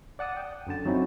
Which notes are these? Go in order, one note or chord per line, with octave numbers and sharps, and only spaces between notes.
D5 F#5 A5 D#6
G5
F#2 D3 A5
F#3 C4 C#4 D#4 E4 F#4